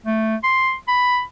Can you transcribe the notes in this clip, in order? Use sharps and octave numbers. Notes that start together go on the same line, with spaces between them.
A3
C6
B5